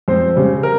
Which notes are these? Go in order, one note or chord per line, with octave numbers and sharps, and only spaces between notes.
F2 C4 C5
C#3 G3
A#4